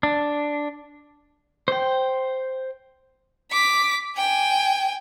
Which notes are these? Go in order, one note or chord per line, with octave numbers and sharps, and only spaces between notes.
D4
C5 G5
D6 B6
G5 G#5